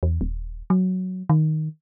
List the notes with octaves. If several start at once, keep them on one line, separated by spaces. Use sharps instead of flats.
E2
D#1
F#3
D#3